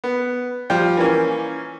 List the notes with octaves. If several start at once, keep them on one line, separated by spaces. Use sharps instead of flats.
B3
F3 G3 G5
E3 A#3 C#4